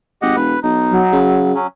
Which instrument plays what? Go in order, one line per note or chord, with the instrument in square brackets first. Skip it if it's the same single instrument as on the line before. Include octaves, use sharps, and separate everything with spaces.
[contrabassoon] G#1 [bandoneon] G4 D#5 F#5
[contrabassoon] E1 [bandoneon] B4
[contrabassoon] B1 [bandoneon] D#4
[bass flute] F#3
[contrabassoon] C#3
[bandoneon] F#3 C#4